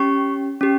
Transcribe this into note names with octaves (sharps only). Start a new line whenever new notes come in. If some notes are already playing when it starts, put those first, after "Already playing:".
Already playing: C#4 G4 C#6
C#4 G4